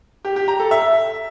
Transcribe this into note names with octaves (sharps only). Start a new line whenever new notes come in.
G4
G4
A#5
A4
E5